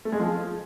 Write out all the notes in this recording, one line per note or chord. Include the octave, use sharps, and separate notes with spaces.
A3
G#3
F3